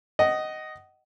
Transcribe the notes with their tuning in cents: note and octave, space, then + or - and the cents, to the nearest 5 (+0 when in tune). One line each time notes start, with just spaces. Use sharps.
D#5 +0 F#5 +30